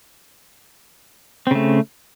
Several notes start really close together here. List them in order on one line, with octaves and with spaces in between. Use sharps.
C4 C#3 A3